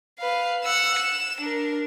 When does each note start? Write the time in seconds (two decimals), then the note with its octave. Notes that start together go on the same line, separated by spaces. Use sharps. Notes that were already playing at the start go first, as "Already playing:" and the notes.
0.19 B4 F5
0.64 F#5 E6
0.99 E7
1.40 D4 A#4